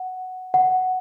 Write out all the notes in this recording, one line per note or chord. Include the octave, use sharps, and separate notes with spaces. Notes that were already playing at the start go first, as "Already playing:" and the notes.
Already playing: F#5
F#5